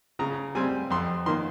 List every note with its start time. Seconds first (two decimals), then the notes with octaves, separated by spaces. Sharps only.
0.19 C#3 A#5
0.55 G3 C4 G#5
0.91 F2 C6
1.26 D#3 A#3 C6